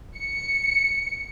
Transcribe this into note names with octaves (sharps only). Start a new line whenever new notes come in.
C#7